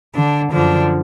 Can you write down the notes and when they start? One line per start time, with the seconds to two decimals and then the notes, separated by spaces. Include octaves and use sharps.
0.14 D3 D4
0.52 F#2 D3 F3 D4